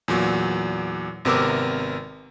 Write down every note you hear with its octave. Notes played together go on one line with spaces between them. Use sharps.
E2 A#2 F#3
G#1 C3 B3 A#4 D6 E6